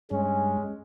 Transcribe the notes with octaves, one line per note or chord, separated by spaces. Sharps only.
G2 G#3 C#4